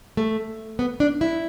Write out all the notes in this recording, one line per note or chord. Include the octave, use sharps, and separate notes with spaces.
A3
B3
D4
E4